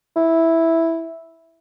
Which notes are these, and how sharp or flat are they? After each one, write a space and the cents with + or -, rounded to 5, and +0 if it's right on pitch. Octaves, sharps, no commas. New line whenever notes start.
E4 -5